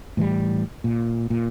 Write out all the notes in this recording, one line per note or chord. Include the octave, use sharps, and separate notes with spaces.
A2 E3 F#3 G3
A#2
A#2